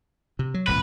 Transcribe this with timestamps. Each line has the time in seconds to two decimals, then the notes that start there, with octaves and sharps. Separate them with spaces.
0.39 C3
0.54 F#3
0.68 D#1 C2 A2 B4